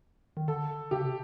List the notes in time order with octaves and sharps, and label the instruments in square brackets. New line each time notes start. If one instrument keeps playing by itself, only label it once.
[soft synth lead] D#3
[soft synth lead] D3 [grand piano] A4
[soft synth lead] C#3 [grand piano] G4
[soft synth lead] C3